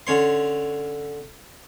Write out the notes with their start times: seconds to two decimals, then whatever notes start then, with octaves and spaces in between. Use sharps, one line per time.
0.07 D3 C#4 C#5 C6